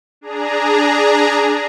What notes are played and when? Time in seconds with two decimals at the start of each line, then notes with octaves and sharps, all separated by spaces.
0.21 D4 G#4 A#5